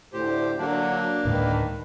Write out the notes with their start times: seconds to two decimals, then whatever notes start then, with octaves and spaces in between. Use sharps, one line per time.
0.13 D2 A2 G4 C5
0.58 D3 F#3 A#3 D4
1.25 D2 A2 D#3 G#3 B4